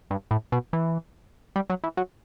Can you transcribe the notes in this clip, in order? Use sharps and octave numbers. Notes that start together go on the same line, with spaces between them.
G2
A2
B2
E3
G3
F#3
E3
F#3